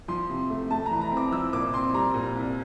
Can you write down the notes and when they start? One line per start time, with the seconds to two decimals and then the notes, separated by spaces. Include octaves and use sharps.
0.08 F3 C6
0.30 C3
0.50 A3
0.70 A3 A5
0.86 A#5
0.91 E3
1.02 A#5
1.11 C4
1.17 D6
1.32 F3 E6
1.53 A#2 D6
1.73 C4 C6
1.94 G3 A#5
2.14 A#2
2.35 C2